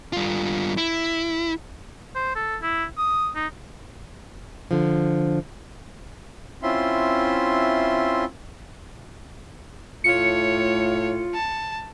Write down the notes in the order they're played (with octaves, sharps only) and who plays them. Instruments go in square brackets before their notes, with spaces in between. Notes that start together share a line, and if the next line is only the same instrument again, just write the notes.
[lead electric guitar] G2 F4
E4
[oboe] C5
A4
E4
D#6
D#4
[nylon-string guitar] D3 F3
[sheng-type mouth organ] C4 C#4 E4 F4 E5 C6
[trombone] A2 [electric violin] A3 C#5 [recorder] F4 [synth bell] C#7
[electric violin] A5